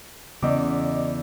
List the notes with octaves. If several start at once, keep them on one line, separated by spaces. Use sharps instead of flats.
E2 C#3 D5 D#5 D6